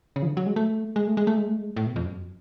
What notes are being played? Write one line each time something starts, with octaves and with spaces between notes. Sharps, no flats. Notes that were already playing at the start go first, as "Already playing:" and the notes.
C#3
F3
D3
F#3
G#3
A3
G#3
A3
G#3
A3
G#3
A3
G#3
A2
B2
F2
F#2